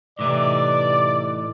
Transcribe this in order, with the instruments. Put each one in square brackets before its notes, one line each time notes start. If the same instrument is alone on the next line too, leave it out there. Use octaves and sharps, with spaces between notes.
[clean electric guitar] A2 E3 D#4 [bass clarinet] C3 [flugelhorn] D5 [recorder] D6